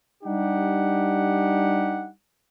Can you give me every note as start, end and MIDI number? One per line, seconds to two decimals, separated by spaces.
0.23 2.08 55
0.23 2.08 62
0.23 2.08 63
0.23 2.08 67
0.23 2.08 78